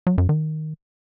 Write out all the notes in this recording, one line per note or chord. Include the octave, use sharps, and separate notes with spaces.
F#3
F#2
D#3